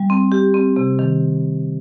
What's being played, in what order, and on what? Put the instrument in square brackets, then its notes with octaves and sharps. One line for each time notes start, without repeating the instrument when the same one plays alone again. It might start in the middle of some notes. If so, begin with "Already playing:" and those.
Already playing: [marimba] G3
C4
G4
C4
C3
D#3